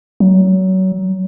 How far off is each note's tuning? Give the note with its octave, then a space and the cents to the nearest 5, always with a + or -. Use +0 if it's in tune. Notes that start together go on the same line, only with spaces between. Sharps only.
F#3 +25